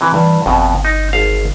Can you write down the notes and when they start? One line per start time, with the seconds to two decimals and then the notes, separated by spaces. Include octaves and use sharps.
0.01 C3 E3
0.14 G2 E3
0.46 G1 F2 B2
0.85 D#4
1.13 G#1 F5 A5